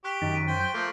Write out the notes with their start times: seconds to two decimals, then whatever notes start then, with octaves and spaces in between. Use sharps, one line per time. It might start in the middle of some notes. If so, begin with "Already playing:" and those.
0.04 G4 C#6 F#6 B6
0.22 F#2 D#3 A6
0.34 B6 D7 D#7
0.47 C5 G5 C6 B6 D7 D#7
0.60 G6
0.74 F3 A3 A#3